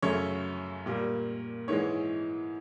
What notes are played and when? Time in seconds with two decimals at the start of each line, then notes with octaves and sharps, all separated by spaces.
0.02 F#2 C#3 F#3 A3 C#5
0.86 A#2 G3 A#3
1.68 G#2 E3 G#3 C#5